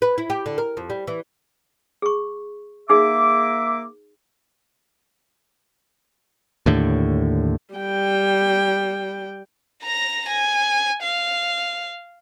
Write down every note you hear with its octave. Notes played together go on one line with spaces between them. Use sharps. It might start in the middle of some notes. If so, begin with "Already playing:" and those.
B4
E4
G4
D3
A#4
F2
G3
E3
G#4 C#6
A#3 D#4 G#4 E5 D6
D#2 A2 D3
G3 G5
A#5 A#6
G#5
F5